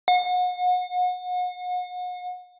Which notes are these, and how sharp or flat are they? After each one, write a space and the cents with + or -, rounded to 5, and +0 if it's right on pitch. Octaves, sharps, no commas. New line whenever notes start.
F#5 -40